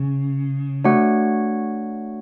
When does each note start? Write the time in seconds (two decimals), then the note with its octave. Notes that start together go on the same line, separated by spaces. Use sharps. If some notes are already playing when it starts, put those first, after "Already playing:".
Already playing: C#3 C#4
0.84 A3 D4 F#4 C#5 F#5